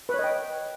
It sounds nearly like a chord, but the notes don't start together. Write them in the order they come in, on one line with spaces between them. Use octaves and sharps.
B4 C#5 D#5 G5